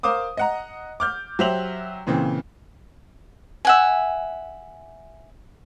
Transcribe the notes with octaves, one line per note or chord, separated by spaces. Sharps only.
A#4 C5 F5 D6 D#6
D#5 F#5 A#5
D6 F6 G6
F#3 G4 C5 E5 F7 F#7
A#2 C#3 E3 C4
E5 F#5 G#5